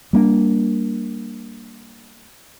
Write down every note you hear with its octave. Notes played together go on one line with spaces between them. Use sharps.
G3 A#3 D4